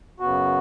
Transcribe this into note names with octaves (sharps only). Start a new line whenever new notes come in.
F#2 C#3 B3 F#4